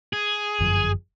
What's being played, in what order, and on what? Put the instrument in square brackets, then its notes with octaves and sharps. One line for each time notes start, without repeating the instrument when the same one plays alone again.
[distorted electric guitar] G#4
[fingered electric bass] G1 F#2 F3